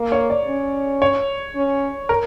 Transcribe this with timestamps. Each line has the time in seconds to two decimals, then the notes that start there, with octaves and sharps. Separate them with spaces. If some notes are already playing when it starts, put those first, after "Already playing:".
Already playing: A#3
0.12 C#5
0.30 D5
0.47 C#4
1.02 C#5
1.56 C#4
2.09 A#4